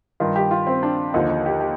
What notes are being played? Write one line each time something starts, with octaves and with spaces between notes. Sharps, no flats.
G2 D#3 F4
G4
F4
C4
D4
D#2 D3 F3 D#4
D#4
G4
G4